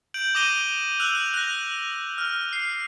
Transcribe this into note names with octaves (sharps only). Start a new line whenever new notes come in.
G6 D7 F#7
D6 D#6 A#6 D#7 G7
E6 F#6 F7
F#6 A#6
F6
F6 C7